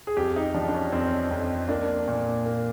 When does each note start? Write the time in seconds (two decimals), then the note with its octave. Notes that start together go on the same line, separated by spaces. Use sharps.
0.07 G#4
0.17 F2 G4
0.36 D#4
0.54 F3 D4
0.68 D4
0.74 C#4
0.92 F2 C4
1.31 F2
1.69 A#3 D4
2.08 A#2
2.45 A#3